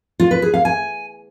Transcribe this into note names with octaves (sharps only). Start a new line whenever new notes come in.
F4
B4
G#4
F5
G#5